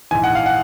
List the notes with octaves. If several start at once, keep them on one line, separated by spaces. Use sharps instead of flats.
A#1 G#2 E3 G#5
F#5
F5
F#5